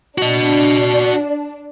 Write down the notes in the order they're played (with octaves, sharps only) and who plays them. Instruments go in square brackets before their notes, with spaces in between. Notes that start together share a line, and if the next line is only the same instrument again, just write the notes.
[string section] D4 [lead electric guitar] F#4 D#5